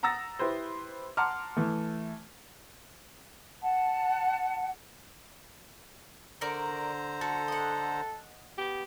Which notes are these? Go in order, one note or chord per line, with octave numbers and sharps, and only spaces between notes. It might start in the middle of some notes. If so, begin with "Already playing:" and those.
F#5 A#5 D#6 E6 A6 A#6
E4 G4 B4 C5
F#5 A5 A#5 C6 D6 F6
E3 A3
F#5 A5
D3 A#4 C5 D5 A#5 C#6
F#4 A4
D#5 F#5
B3 G4